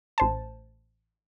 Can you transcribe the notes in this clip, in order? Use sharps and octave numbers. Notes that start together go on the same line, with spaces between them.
A1 C5 A5